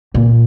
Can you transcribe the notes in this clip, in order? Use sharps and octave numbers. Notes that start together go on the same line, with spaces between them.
A#2